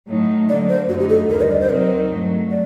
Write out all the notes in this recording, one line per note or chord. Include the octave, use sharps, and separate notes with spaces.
A2 F#3 A3 D#4
D3 F#3 A#3 D5
C5
F#2 D3 A3 D#4 F#4
G4
A4
D#2 D3 G3 A#4
D#5
D5
C5
C3 F#3 C4 D#4 A#4
G2 F#3 A3
D5